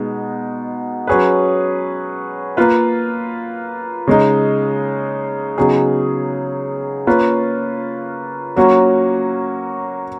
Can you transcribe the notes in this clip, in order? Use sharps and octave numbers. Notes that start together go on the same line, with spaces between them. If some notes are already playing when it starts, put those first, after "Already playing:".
Already playing: B2 G#3 B3 D#4
F#3 C#4 G#4 B4
A#3 F4 B4
C#3 G#3 D#4
C#3 F#3 B3 D#4 G#4
A#3 C#4 F4 B4
F#3 A#3 C#4 F#4